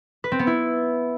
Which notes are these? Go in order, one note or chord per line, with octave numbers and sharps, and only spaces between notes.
B4
C4
B3
E4